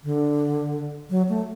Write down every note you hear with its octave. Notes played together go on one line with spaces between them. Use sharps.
D3
F#3
A3